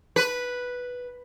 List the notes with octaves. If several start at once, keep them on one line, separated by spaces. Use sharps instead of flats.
B4